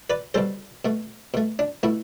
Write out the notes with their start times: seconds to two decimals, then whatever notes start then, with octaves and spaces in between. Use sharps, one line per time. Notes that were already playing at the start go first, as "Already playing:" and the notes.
0.10 B4 D5
0.34 B2 G3 A4 C5
0.85 B2 A3
1.34 B2 A3
1.59 D4
1.83 B2 A3 E4